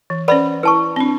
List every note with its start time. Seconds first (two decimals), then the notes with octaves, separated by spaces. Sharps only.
0.10 E3
0.28 C#4 B4 C5 D5 F#5 B5
0.63 E4 B4 A5 C#6
0.96 C4 D4